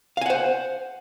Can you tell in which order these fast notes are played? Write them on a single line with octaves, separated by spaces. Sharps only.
F5 G#5 F#5 C5